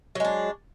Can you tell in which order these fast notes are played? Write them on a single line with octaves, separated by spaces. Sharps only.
F#3 G#3 D4